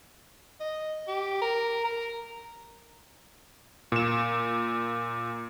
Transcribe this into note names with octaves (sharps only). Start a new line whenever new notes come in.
D#5
G4
A#4
A#4
A#2 E7